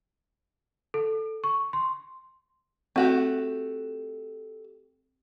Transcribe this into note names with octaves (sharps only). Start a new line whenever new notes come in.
A4
C#6
C6
A3 C4 F#4 G4